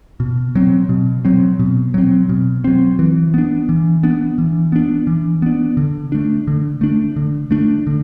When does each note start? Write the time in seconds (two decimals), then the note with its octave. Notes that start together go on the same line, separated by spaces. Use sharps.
0.20 B2
0.55 F#3 C4
0.89 B2
1.25 F#3 C4
1.59 B2
1.94 F#3 C4
2.29 B2
2.64 F#3 C4
2.99 E3
3.34 B3 D4
3.69 E3
4.03 B3 D4
4.38 E3
4.72 B3 D4
5.07 E3
5.42 B3 D4
5.77 D3
6.12 A3 D4
6.47 D3
6.81 A3 D4
7.16 D3
7.51 A3 D4
7.87 D3